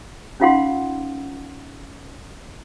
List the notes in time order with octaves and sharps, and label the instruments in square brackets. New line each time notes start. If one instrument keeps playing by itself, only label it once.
[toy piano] C#4 D#4 F4 F5 F#5 C6